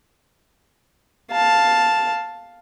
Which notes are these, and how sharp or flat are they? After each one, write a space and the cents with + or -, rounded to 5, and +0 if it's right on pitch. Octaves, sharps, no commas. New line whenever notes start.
F5 +5 A5 +0